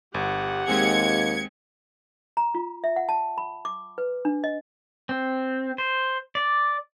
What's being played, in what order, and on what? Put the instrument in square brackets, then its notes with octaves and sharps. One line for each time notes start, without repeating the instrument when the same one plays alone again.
[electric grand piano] G1 [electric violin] G4 F#5
[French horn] D#2 [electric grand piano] G#3 C4 G#4 [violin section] G#6 C#7
[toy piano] A#5
F4
E5
F#5
A5
B5
D6
B4
D4
D#5
[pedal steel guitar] C4
C5
D5